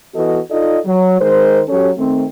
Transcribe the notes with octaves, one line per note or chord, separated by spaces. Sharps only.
E3 B3 F#4 A4 D#5
D#4 F4 A4 D5 D#5
F#3
D#3 G#3 A#4 C5
F#3 C#4 G4 A4 C#5
D#3 A3 C4